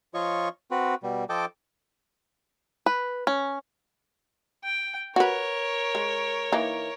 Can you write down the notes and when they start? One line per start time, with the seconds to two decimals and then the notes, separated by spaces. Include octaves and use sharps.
0.14 F3 F4 C#5 D#5 C#6
0.71 C4 F#4 B4
1.03 B2 G3
1.29 F3 A4 D#5 G5 D6
2.86 B4
3.27 C#4
4.64 G5
5.16 F#4 A#4 B4 C#5
5.95 G#3
6.53 E3 A#3 D#4